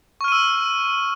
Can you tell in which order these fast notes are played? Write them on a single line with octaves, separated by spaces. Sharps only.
C#6 F6 D#7 E6